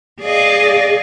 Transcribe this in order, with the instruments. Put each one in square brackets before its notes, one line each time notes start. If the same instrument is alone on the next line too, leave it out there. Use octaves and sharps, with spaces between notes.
[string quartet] G#4 D5 D#5 F5